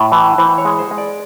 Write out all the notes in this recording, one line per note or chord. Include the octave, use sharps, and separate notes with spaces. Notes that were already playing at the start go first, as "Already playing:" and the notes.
Already playing: A2
E3
E3 C5
C#5
G#3
C5
G#3
D5